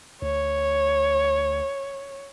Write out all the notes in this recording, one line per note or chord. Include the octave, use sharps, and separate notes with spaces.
D2 C#5